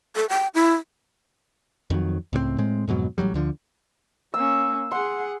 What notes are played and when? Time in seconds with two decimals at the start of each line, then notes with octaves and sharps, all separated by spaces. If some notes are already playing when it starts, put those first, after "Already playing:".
0.16 A4
0.29 G5
0.54 E4
1.90 F2 D#3 F#3
2.33 C#2 A2 G3 C4
2.58 A2 G#3 C4
2.88 F2 G#2 B2 F#3
3.18 A1 D3 F#3 G3
3.34 D2 D3 F3
4.34 A#3 C#4 E6
4.92 G#4 F#5 C6